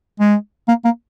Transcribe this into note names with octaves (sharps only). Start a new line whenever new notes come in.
G#3
A#3
A#3